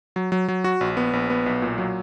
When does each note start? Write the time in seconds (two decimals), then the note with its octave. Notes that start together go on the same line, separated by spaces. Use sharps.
0.16 F#3
0.32 F#3
0.48 F#3
0.64 F#4
0.81 A#1
0.97 B3
1.13 A#1
1.30 B3
1.46 B1
1.62 A#2
1.78 F#3